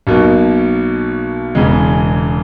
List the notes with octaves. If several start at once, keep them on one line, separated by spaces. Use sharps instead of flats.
B1 B2 A#3
E1 E2 C#3 G#3